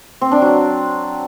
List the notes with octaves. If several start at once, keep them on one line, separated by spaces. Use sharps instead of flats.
C4
D4
F#3